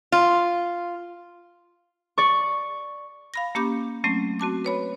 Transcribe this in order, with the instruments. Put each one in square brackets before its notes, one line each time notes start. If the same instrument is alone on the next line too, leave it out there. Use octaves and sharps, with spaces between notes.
[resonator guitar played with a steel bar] F4
[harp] D5 C#6
[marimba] F5 B5 A#6
A#3 C#4 G4 B5 D6 G6
F#3 A3 C4 C#4
C4 F#4 A5 D6
B4 C#5 B5